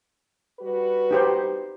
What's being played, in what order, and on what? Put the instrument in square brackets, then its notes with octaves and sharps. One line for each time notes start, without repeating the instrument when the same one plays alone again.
[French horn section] G3 F#4 B4
[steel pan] D#4 G4 C5